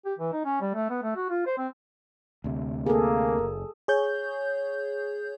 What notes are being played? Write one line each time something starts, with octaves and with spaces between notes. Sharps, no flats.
G4
E3
D#4
C#4
G3
A3
B3
A3
F#4
F4
C5
C4
D2 C3
A#3 G#4 A4
F#1
G#4 C#5 G6